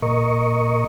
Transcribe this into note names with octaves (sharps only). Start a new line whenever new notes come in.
A#2 A#4 D#5 C#6